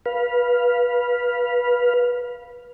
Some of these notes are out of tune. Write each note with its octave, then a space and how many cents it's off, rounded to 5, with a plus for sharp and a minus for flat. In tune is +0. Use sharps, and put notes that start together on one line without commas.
B4 -20 F5 +5